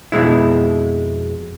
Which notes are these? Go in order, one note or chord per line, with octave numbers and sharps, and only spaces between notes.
F2 B2 G#3 E4